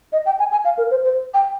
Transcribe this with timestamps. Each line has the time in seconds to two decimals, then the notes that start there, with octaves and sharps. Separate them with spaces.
0.13 D#5
0.26 G5
0.39 G#5
0.52 G#5
0.65 F5
0.78 A#4
0.91 C5
1.04 C5
1.34 G5